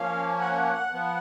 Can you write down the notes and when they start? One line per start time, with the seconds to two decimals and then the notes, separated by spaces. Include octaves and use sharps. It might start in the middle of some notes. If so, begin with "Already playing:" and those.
Already playing: F3 A#3 C#4 F5
0.41 F#5
0.92 F3 B3